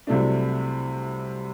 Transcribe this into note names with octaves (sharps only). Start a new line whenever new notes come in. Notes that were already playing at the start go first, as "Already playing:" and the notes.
C2 C3 F#3 A3 D4